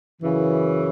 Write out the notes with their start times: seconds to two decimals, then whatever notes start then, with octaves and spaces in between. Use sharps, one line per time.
0.22 F#2 C#3 E3